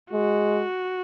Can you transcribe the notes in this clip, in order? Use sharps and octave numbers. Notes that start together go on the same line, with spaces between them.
G#3 F#4